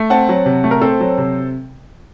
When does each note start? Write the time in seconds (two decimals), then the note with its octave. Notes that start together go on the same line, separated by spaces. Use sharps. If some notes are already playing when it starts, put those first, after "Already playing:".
Already playing: A3
0.10 C4 F#5 A5
0.29 F#3
0.46 C3
0.64 A3
0.71 A#4
0.81 C4 A4 C5
1.00 F#3
1.18 C3